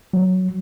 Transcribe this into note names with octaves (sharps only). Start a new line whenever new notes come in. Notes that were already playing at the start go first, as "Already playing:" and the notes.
F#3